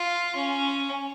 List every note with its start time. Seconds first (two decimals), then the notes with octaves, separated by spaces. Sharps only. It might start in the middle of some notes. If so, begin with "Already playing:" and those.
Already playing: F4
0.35 C#4